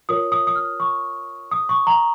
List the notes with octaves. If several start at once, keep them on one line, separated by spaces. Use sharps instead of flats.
F4 A#4 C#5 D#6
D#6
D#6
F6
C#6
D#6
C#6
A#5